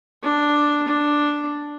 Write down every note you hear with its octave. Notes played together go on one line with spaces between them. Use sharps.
D4
D4